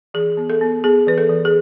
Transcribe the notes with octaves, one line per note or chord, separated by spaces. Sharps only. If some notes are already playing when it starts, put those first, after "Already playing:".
E3 G#4
B3
A4
B3
B3 G#4
E3 B4
A4
E3
G#4